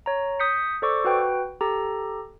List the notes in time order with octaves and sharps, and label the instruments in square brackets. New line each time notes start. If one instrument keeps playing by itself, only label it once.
[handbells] C#5 A#5
D#6 G6 B6 C#7
A4 C5 D5 C#6 D6 E6
F#4 B4 G5
G4 A4 A#5